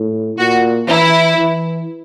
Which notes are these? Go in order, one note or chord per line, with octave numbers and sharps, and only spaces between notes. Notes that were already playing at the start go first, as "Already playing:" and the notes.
Already playing: A2
A#2 F#4
E3 E4
E3